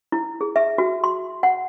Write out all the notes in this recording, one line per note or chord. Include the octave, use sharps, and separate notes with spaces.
E4
G#4
E5
F#4
C6
F#5